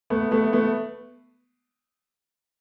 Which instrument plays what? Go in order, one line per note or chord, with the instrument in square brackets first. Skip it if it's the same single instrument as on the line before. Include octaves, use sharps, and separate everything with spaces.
[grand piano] A3 B3
A3 B3
A3 B3